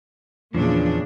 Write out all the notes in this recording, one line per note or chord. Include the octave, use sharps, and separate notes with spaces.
E2 A#2 C#3 F3 D4